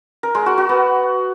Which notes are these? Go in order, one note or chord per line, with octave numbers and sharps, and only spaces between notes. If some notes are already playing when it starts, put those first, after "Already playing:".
A#4
G#3
F#4
F#4
B3